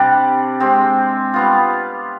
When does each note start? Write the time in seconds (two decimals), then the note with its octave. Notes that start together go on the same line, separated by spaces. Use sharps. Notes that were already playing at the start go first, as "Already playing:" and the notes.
Already playing: C3 G3 D4
0.60 G#3 C4 G4
1.34 G3 B3 F4